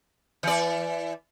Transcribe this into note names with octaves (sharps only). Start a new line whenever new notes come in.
E3 D5